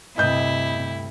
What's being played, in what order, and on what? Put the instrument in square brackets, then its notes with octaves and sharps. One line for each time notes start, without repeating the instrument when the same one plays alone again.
[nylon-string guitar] D2 G2 [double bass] C3 [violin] E4 [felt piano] D#5 G6